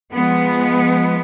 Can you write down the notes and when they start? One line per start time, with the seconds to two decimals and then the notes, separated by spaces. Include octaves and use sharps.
0.13 F3 G#3 B3